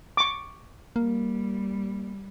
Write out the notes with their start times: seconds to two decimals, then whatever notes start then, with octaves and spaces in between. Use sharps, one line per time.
0.17 C#6 D6
0.96 G3 A#3